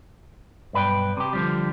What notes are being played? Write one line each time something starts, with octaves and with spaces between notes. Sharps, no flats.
B1 G2 B4 D5 G5
C3 G4
D3 F3 G3